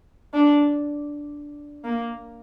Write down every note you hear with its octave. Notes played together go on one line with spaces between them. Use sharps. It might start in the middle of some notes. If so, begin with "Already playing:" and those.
D4
A#3